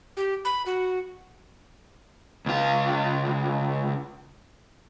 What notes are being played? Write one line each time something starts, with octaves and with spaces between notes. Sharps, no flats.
G4
B5
F#4
C#2 F4